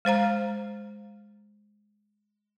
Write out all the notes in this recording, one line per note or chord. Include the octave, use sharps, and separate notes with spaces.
G#3 C5 F5 A#5